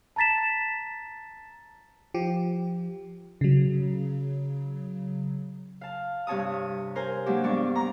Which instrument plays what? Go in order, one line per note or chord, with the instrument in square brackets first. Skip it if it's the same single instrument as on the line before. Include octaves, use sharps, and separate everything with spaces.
[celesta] A5 A#5 A6 B6 E7
[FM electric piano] F3 G4
C#3 F#3
[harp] F5 A5
G2 C3 C#5 A5 D#6
A#4 C5 G#5
F#3 G#3 A#3 D4 G4
G2 B3 D4 D5 C#6
A#5 D6